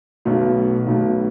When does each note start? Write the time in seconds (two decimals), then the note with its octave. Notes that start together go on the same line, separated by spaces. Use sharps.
0.25 B1 B2 A3
0.86 B1 B2 A3